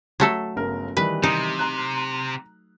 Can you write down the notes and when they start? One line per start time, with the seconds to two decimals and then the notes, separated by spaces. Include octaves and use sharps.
0.20 F#3 A3 A4
0.56 G1 C#3 A#4
0.97 D#3 E3 G3 B4
1.23 C3 D#4
1.59 A#5 F#6